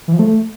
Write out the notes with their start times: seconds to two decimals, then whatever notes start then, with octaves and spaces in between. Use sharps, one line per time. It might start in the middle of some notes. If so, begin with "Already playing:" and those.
0.08 E3
0.13 F3
0.19 A3